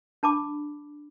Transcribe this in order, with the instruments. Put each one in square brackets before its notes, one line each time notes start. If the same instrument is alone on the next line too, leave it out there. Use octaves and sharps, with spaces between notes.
[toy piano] D4 A5 B5 D6